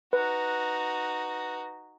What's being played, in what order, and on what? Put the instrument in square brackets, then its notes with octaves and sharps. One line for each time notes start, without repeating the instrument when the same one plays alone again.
[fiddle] D#4 F#4 [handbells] B4